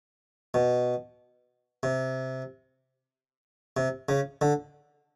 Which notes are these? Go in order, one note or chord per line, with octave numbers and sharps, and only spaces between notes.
B2
C3
C3
C#3
D3